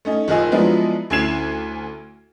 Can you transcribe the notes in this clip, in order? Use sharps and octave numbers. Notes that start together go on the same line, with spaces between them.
A3 C#4 D#4
F#1 D#3 F4 D#5 G#5 E6
F3 F#3 G#3 B3 D4 E4
D2 C#4 E4 G#6 C7 E7